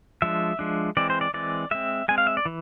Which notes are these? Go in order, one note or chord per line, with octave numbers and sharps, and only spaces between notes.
F3 G#3 D4 E5
F3 G#3 D4
E3 G#3 C4 D5
C5
D5
E3 G#3 C4 D5
G#3 C4 E5
G#3 C4 G#5
F5
E5
D5
E3